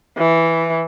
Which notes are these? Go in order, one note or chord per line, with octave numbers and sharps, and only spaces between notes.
E3